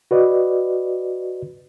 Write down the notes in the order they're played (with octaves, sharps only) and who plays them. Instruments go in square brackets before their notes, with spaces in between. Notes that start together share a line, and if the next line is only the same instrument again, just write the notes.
[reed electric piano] F#4 B4 D5 D#5